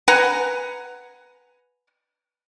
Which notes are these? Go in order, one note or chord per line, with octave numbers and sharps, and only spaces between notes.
B4 F#5 G#5 A#5